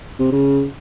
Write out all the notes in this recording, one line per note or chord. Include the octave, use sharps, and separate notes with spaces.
C3
C#3